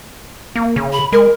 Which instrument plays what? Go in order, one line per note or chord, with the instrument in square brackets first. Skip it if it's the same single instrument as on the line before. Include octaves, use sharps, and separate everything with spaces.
[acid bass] A#3
C#3
[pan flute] B5
[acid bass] G#3 [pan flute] A#4